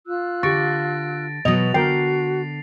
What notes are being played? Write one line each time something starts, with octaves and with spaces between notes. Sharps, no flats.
F4 E6 F#6
D3 G4 C#6 A6 A#6 D7
B2 F#3 B4 D#5 F7
D3 F#4 A#4 G5 C7